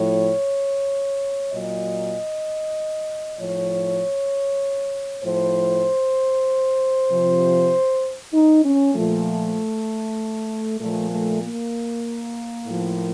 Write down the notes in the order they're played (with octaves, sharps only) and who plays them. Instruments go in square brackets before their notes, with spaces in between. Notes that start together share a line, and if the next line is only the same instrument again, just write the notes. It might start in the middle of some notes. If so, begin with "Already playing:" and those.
Already playing: [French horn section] A2 F3 C#5
A#2 F#3 D#5
A2 F3 C#5
A2 F3 C5
C3 F3
D#4
C#4
A#2 F3 A3
A#2 F3 A3
A3
A#3
A2 F3